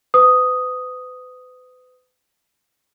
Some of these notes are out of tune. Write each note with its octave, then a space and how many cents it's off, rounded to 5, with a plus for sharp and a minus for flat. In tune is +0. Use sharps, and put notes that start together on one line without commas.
B4 +40 D#6 +0